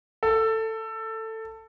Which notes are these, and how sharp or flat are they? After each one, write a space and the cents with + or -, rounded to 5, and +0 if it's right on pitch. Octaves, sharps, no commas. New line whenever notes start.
A4 +15